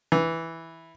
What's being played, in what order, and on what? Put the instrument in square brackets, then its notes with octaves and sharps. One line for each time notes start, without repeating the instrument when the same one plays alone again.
[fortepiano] E3